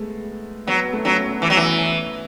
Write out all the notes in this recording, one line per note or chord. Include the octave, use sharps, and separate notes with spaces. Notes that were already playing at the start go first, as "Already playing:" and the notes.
Already playing: G#3 A3 B3
F#3 B3
A3
F#3 C#4
B3
E3 B3
F#3
E3